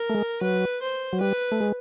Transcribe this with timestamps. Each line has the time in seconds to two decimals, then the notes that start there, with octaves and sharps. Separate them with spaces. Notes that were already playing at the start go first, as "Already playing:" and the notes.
Already playing: A#4
0.10 A3
0.15 G#3
0.41 F#3 B4
0.82 C5
1.13 F#3
1.20 G3 B4
1.52 A3
1.60 G#3